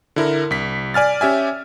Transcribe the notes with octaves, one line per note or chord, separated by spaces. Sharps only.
D3 E4 A#4
C2 B6
D5 G#5 F6 A6
C#4 G4 E5 G#5